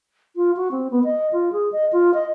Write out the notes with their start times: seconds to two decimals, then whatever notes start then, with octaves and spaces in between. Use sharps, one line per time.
0.36 F4
0.56 F#4
0.72 C4
0.91 B3
1.04 D#5
1.33 F4
1.53 G#4
1.72 D#5
1.93 F4
2.14 D#5